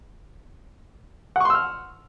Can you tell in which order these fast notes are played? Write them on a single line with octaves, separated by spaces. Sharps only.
F#5 C#6 C6 E6 F6